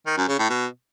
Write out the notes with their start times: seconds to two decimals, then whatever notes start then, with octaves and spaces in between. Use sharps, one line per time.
0.06 D#3
0.17 F#2
0.28 C#3
0.39 A2
0.50 B2